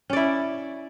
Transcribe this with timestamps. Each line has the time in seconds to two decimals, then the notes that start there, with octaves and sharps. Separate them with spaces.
0.10 C#4
0.13 D5
0.16 E4